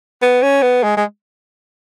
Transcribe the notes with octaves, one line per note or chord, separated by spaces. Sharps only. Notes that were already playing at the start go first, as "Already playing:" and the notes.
B3
C#4
B3
G#3
G#3